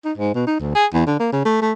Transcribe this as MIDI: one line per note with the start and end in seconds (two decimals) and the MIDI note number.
0.05 0.12 63
0.17 0.34 44
0.34 0.45 47
0.47 0.58 63
0.59 0.70 38
0.75 0.86 68
0.93 1.05 40
1.06 1.15 50
1.19 1.28 58
1.32 1.45 49
1.45 1.61 57
1.62 1.72 57